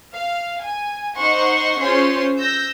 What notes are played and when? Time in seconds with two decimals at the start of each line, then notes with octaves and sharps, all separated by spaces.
0.13 F5
0.62 G#5
1.18 D#4 C5 F#5 C6 C#6
1.80 C#4 F4 G#4 C5 C#5 C6
2.37 E6 G6 A#6